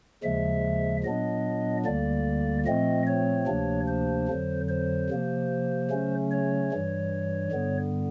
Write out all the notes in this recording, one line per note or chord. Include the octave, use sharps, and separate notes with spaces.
D#2 C#3 F3 G#3 E5
A#2 F#3 B3 D4 D#5
D2 D3 G3 A#3 D5
A#2 F3 A3 C4 D#5
C#5
D2 C3 F3 A#3 D4
C5
F2 D3 F#3
C5
C3 F3 A#3
C#3 F#3 A3 C#4
C#5
G2 E3 G3
G2 D3 G3 B3